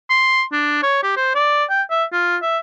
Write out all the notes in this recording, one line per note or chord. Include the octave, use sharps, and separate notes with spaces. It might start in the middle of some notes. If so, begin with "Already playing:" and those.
C6
D4
C#5
G4
C5
D5
G5
E5
F4
E5